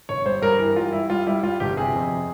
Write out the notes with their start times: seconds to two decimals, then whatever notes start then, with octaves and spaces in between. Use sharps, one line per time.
0.09 G1 C#5
0.26 G2 C5
0.42 G2 A#4
0.59 E3 A#4
0.76 G3 F4
0.92 G3 E4
1.10 G3 F4
1.27 G3 E4
1.43 G3 F4
1.60 G1 G4
1.77 C3 G#4
1.93 F2